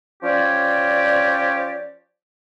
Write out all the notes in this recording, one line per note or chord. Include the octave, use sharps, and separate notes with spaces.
F3 C#4 G4 C#5 D5